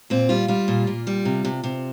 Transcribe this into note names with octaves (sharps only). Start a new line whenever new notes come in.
A#2 C4
G3 F4
G3 F4
A#2
A#2
G3
C3
C3
C3